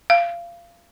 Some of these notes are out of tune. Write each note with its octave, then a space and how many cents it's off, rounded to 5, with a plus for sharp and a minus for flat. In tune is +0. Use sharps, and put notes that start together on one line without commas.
F5 -25